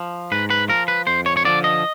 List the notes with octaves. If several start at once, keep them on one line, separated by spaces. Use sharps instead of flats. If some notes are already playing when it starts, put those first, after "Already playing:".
Already playing: F3
G#2 B4
B4
F3 A#4
B4
F2 C5
C#5
C#5
D3 F3 D5
D#5